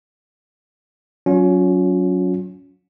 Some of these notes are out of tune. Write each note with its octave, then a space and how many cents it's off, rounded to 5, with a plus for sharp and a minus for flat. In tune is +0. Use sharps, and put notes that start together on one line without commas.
F#3 +0 C#4 +20 F4 +45